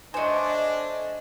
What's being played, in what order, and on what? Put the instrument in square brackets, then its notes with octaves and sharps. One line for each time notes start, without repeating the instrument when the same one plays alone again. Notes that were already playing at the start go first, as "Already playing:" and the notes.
[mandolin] A3 C5 [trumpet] D4 [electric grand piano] D#5 G#5